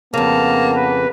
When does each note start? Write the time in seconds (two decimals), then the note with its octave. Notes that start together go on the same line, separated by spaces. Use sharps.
0.14 F2 C#3 A#3 B3 A5
0.75 B4